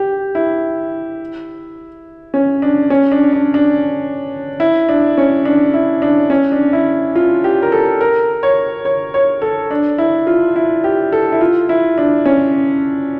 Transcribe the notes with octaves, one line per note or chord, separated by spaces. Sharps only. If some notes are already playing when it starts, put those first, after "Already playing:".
Already playing: G4
E4
C#4
D4
C#4
D4
D4
D4
E4
D4
C#4
D4
E4
D4
C#4
D4
E4
F4
G4
A#4
A4
A#4
C#5
C#5
C#5
A4
D4
E4
F4
E4
G4
A4
E4
F4
E4
D4
C#4